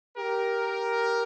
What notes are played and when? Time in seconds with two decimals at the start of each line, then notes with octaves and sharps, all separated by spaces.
0.16 G4 A#4